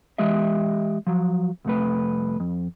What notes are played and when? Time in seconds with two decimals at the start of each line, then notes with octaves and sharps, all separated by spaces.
0.18 E3 G#3 G4 D#5 E5
1.07 F3 F#3
1.65 C2 F2 A3 B4
2.40 F2